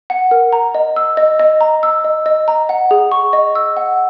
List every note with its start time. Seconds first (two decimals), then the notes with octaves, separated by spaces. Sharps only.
0.10 F#5
0.31 A#4
0.53 A#5
0.75 D#5
0.96 E6
1.17 D#5
1.39 D#5
1.61 A#5
1.83 E6
2.04 D#5
2.26 D#5
2.48 A#5
2.69 F#5
2.91 G#4
3.12 C#6
3.33 D#5
3.55 E6
3.77 F#5